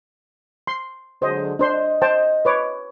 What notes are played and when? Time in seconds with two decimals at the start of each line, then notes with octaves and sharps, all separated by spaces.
0.67 C6
1.22 D3 F#3 G#3 C5 D#5
1.59 D4 C5 D#5 C6
2.02 C5 G5 A5
2.45 B4 C#5 D6